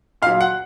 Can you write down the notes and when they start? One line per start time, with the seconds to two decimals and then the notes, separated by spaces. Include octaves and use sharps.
0.22 A#2 F5
0.26 F#3
0.41 F#5